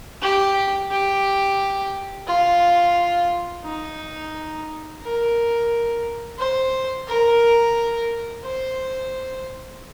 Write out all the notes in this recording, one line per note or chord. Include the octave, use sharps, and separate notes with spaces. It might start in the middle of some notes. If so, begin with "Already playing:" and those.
G4
G4
F4
D#4
A#4
C5
A#4
C5